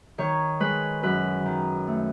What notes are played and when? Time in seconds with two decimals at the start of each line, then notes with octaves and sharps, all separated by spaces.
0.18 D#3 C#5
0.60 G#3 B4
1.03 F#2 B4
1.45 D#3
1.87 A3